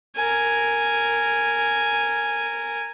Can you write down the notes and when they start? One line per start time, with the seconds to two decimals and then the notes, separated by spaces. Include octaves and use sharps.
0.16 A#4 G#5